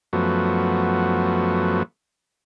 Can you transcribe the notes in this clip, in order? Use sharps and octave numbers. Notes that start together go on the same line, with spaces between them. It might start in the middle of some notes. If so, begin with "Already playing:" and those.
F#2 F3 A3 B3 F#4